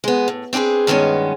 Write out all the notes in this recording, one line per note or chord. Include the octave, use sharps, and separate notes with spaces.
G#3 B3
A2
C4 D4 F4 G#4 B4
G2 D#3 G#3 B3 C#4